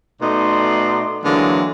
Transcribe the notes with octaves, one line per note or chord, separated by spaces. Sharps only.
B2 A3 D#4 D5 C6
D3 E3 F#3 G#3 A#3